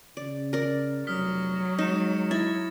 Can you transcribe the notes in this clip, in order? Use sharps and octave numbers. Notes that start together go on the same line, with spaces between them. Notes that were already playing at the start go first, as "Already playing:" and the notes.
C#3 D5
A#4 D5
F1 F#3 D#6 F6 B6
G#3 D#4 F6 C#7 E7
E4 A6 A#6